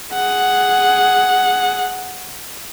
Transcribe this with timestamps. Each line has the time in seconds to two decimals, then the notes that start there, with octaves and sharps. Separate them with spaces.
0.14 G#4 F#5